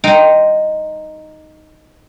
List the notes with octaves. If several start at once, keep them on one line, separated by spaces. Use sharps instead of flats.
D#4 G5 A#5 C6